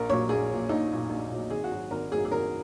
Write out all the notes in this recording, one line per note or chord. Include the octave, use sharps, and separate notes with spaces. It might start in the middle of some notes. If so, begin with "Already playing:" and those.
Already playing: A#1 A#4
A#2 F#3 C#5
A#1 G#4
A#2 F#3
A#1 D#4
A#2 F#3
A#1
A#2 F#3
G#1 G#4
F#4
G#2 F#3
G#1 A#4
G#2 F#3 G#4
G#4
G#1 A#4